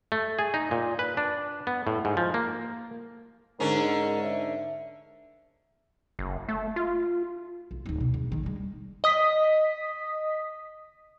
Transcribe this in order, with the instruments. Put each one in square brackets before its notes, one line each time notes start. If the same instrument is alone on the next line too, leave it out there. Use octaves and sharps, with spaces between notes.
[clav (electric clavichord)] A3
G#4
D#4
A#2
B4
D4
B3
A2
G#2
F3
A#3
[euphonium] G#2 [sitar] D3 C#4 [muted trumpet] A#4
[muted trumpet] E5
[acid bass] F#1
A3
F4
[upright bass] B1
D1 D#4
B2
A#1
A#1 D#3
G3 G#3
[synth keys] D#5 D#6 B6